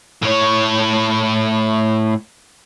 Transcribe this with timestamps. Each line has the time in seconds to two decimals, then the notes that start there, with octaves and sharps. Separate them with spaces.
0.22 A2 C#5